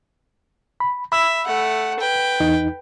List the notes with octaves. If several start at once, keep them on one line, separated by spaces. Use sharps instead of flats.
B5
E5 B5 E6
A3 F#5
B4 G5
E2 D#4